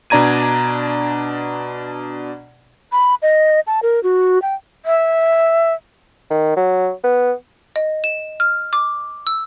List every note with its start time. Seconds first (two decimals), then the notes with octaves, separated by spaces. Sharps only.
0.10 B2 D4 D5 A#5 G#6 D#7
2.92 B5
3.22 D#5
3.67 A5
3.83 A#4
4.03 F#4
4.42 G5
4.85 E5
6.31 D#3
6.57 F#3
7.04 B3
7.76 D#5
8.04 E7
8.40 F6
8.73 D6
9.27 E6